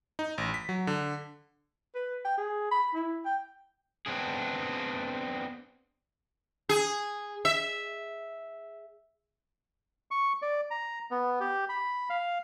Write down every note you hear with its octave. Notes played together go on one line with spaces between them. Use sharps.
D#4
A1
B6
F#3
D3
B4
G5
G#4
B5
E4
G5
B3 C4 D4 G#4
G#4
E5
C#6
D5
A#5
B3
G4
B5
F5